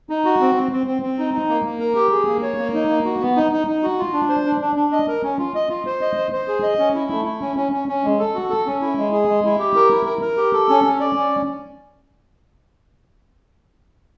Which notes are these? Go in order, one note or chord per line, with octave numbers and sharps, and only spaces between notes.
D#4
F#4
C4
C4
C4
C4
C4
D#4
D#4
A#3
A#3
A#4
G4
G#4
A#3
C#5
A#3
D#4
A#3
F#4
B3
D#4
D#4
D#4
F#4
F4
D4
C5
D4
D4
D4
D#5
A#4
C#4
F4
D#5
F4
C5
D#5
C5
C5
G#4
D#5
C#4
E4
A3
E4
C#4
C#4
C#4
C#4
G#3
A4
F#4
A4
C#4
E4
G#3
G#4
G#3
E4
G4
A#4
E4
A#4
A#4
G4
A4
C#4
C#4
D5
C#4